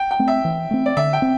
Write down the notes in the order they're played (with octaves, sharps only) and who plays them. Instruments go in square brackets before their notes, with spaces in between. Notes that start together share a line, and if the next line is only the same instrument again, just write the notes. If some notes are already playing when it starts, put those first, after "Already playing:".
Already playing: [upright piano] G5
G5
[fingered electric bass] A3 C4
[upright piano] E5
[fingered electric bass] E3
A3 C4
[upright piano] D5
[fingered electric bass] D3 [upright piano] E5
[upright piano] G5
[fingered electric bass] C4